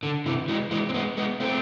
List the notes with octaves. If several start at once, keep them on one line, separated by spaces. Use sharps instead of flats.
D3
C3 E3
E3 G#3
E3 G#3
C4
G#3 B3
G#3 B3
A3 C4